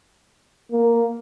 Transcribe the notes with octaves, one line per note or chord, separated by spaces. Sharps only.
A#3